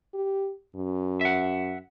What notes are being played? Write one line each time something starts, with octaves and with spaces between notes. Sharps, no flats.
G4
F#2
E5 F#5